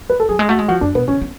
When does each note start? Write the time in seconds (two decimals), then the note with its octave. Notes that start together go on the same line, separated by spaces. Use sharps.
0.10 B4
0.20 A4
0.29 F#3 G#4
0.39 G#3
0.49 A3 F#4
0.59 G#3
0.68 F3 F#4
0.81 F#2 D4
0.95 B2 B3
1.08 C#3 C#4
1.22 B3